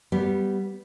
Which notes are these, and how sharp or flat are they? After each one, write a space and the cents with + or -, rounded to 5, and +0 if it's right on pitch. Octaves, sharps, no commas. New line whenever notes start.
G3 -10 B3 +0